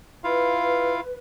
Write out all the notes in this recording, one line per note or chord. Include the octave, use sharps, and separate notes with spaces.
E4 F4 B4 F5